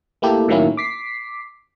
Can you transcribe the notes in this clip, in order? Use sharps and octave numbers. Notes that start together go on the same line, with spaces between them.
A3 A#3 E4 G4 A4
A2 D#3 F#3 A#3 C#4 E4
D6 B6 C7